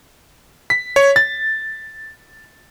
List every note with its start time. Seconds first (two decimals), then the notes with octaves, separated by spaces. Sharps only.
0.70 B6
0.96 C#5
1.16 A6